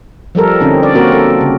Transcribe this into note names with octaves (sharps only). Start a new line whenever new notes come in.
F3 G3 A4 A#4
D3 C4 C#4 D#4
D5
A#3 C4 F#4 A#4
A4
C#3